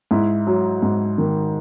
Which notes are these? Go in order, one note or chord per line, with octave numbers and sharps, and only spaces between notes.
G#2 E4
F#3
G#2
D#3